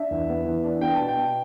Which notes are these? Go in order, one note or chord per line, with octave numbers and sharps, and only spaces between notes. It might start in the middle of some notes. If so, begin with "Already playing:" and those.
Already playing: D4 E5
E2
B3
E3
D4
B3 G5
A5
B2
G5
B2